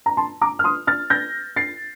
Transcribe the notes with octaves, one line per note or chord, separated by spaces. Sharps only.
A#5
A5 C6
A#5 D6
F6
C6 D#6
F6 A6
G6 A#6
A6 C7